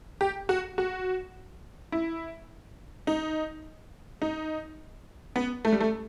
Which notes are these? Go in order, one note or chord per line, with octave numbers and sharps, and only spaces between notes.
G4
F#4
F#4
E4
D#4
D#4
B3
A3
G3
A3